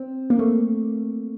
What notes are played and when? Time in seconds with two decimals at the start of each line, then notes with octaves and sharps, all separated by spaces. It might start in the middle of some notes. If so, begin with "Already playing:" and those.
Already playing: C4
0.30 A#3
0.39 A3